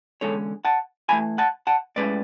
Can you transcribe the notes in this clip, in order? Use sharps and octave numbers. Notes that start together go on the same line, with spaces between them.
E2 D3 G#3 C#4 A4 C#5
F#5 A5
F#2 E3 A3 G#5 B5
F#5 A5
F#5 A5
A2 G#3 C#4 B4 D5